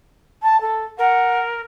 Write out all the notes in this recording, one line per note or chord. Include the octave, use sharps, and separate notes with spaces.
A5
A4
A#4 F#5